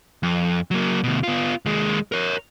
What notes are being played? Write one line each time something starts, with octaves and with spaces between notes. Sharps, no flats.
F2
F#3 A#3
D2 B2
B3 F4
D#2 G#3
A#4 C#5